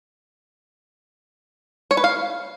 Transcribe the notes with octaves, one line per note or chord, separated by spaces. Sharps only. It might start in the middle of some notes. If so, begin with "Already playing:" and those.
C#5
B4
F5